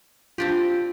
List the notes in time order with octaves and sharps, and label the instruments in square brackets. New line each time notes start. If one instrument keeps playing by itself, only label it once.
[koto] C4 D4 G4 [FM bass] F4